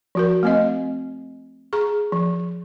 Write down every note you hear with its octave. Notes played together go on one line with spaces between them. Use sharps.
F3 F#4 A#4
A3 C4 D#5
G#4 A#5 C#6
F3